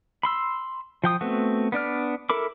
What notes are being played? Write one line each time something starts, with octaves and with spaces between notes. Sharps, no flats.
B5 C6 E6
F3 G5 D#6
A3 B3 C4 F#4
B3 D4 D5 F6
E4 A4 A#4 B5 D6